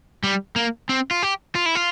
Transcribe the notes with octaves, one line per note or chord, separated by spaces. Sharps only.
G3
A#3
C4
F4
G4
F4
E4
F4